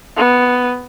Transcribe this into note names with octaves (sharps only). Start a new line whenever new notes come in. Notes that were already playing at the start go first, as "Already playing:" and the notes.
B3